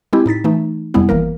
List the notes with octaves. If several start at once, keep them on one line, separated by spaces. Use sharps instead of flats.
G#3 C4 E4 G4
A2 D#4 A6 B6
E3 A3 D#4
F2 C3 G3 G#3 B3 E4
G#1 E3 A#3 A#4